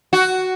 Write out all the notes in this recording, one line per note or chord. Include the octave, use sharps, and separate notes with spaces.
F#4